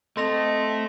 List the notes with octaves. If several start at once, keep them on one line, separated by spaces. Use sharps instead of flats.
A3 C4 A4 D#5 C6 A#6 F7